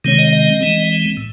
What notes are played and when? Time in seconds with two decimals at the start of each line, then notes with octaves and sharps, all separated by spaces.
0.05 C3 D#3 G#3 C4 C#5
0.19 D#5
0.33 D#5
0.61 E3 G#3 C4
1.17 A2